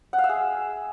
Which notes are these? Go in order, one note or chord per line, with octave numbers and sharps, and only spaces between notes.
F#5
F5
E5
G#4